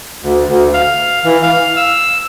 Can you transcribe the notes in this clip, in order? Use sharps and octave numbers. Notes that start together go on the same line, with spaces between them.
D2
D2
F5
E3
F5
E6